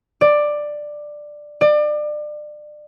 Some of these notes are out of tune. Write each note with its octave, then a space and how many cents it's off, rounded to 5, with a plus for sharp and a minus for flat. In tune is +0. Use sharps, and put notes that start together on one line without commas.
D5 +10
D5 +30